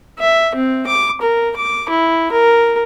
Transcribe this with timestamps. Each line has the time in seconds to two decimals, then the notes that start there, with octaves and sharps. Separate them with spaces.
0.19 E5
0.55 C4
0.87 D6
1.22 A#4
1.57 D6
1.90 E4
2.32 A#4